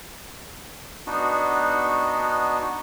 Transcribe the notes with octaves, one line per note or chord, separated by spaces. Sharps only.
B3 D4 D#4 F#4